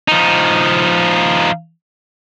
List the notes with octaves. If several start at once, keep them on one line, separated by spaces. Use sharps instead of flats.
F3 D#4